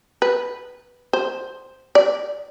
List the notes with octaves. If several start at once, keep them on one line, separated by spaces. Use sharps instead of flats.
B4
C5
D5